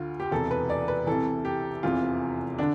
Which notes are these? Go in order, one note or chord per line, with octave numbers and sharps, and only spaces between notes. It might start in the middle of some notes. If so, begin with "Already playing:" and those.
Already playing: D2 D3 F4
G4
E1 E2 C3 E3 A4
B4
D5
B4
C2 C3 E3 A4
G4
F1 E2 C3 E3 F4
D3 D4